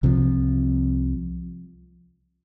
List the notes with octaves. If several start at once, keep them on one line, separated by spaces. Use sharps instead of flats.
C2 C3 F3